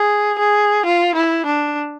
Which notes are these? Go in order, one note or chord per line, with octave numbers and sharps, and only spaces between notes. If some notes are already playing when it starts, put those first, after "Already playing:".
Already playing: G#4
G#4
F4
E4
D4